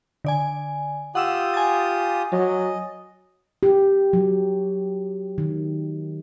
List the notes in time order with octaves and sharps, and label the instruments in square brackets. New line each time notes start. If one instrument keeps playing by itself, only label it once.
[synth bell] D3 D5 G#5
[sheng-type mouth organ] F4 G4 D#6 [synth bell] F#5 E6 E7
[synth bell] G#5 A6
[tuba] F#3 [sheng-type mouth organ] D#5
[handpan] G4
F#3
D#3